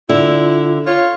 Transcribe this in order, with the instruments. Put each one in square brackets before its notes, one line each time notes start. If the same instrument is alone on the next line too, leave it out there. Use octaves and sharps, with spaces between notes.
[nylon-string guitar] D3 [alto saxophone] E4 [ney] F4
[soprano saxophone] F4 [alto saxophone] C#5